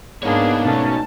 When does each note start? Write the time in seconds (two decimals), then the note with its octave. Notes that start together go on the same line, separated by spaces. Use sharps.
0.23 G#2 A#3 B3 D4 D#4 G#4 C#5
0.65 B2 A3 C#4 A5